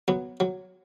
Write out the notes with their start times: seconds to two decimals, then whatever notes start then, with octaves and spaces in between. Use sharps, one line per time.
0.08 F#3 B3
0.40 F#3